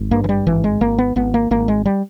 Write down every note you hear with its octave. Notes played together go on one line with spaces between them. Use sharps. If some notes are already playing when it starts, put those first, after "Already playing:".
Already playing: G#1
G2 A#3
E3
G3
G#1 E3
G#3
G#1 A#3
B3
G#1 B3
A#3
G#1 A#3
G#3
G3